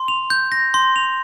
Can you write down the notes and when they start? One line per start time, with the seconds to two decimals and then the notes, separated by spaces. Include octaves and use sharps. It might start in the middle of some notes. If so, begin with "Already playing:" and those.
Already playing: C6
0.08 F7
0.30 G6
0.52 A#6
0.74 C6
0.96 F7